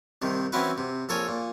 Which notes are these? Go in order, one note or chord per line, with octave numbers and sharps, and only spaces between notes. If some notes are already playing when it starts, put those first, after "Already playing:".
C2 C3 D#3
E3 C4 C#4 E4 F#4 B4
C3
A#1 A4 A#4 C#5 G#5
A#2